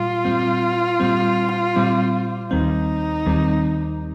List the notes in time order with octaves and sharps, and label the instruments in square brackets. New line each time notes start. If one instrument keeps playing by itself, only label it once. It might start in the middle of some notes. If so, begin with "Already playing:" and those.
Already playing: [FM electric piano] A#2 G3 [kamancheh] F4
[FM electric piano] A#2 G3 C4
A#2 G3 C4
A#2 G3 C4
[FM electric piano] D#2 D#3 G3 C4 [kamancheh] D#4
[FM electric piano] D#2 D#3 G3 C4